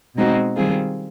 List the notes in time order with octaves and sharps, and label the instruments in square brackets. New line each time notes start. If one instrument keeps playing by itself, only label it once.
[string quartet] B2 G#3 C4 D#4 F#4
D#3 G3 C4 F4 G#4